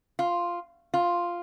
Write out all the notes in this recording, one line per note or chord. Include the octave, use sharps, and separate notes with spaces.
F4
F4